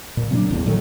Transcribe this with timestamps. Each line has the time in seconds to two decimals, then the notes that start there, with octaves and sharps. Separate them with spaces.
0.17 A#2
0.31 C3 F#3 A#3 D4
0.50 D#1 A1 E2
0.66 A2 D#3 F#3 A3